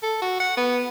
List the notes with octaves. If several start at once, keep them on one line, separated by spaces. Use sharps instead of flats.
A4
F#4
F#5
B3